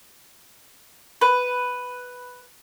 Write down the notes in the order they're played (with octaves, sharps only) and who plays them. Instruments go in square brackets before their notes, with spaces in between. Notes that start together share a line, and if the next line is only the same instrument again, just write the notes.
[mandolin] B4